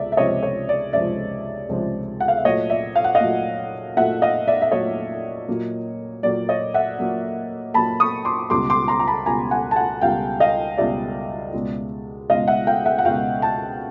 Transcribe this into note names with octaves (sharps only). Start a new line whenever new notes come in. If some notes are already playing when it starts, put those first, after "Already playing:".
Already playing: C#2 C3 G#3 D5 E5
E5
C#2 C3 F3 G#3 C#5 D#5
C#5
D5
C#2 C3 F3 G#3 D5 E5
C#2 C3 F3 G#3
F#5
F5
E5
A#2 F#3 A3 C#5 D#5
D5 E5
F5
F#5
D#5 F5
A#2 F#3 A3
A#2 F#3 A3 E5 F#5
D#5 F5
D5 E5
E5
A#2 F#3 A3 C#5 D#5
A#2 F#3 A#3
A#2 F#3 A#3 D5
C#5 D#5
E5 F#5
A#2 F#3 A#3
A#2 F#3 A#3 A5 B5
C#6 D#6
C6 D6
C#2 B2 G3 C6 D6
C6 D6
A#5 C6
A#5
A5 B5
C#2 B2 G3 G#5 A#5
F#5 G#5
A5
F#5 G#5
C#2 B2 G3 F5 G5
D#5 F5
C#2 B2 G3 D5 E5
C#2 B2 G#3
C#2 B2 G#3 D#5 F5
E5 F#5
F5 G5
E5 F#5
F#5
C#2 B2 G#3 F5 G5
G5 A5